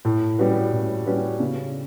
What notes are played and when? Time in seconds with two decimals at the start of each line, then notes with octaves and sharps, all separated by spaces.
0.05 A2
0.39 G3 C#4 F#4 B4
0.73 A2
1.06 G3 C#4 F#4 B4
1.40 C#3